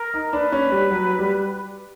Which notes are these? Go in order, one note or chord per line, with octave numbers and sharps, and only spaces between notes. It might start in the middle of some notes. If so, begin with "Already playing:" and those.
Already playing: A#4
D#4
D4 B4
C#4
G3
F#3
G3